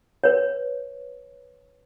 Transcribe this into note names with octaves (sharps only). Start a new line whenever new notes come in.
B4 C#5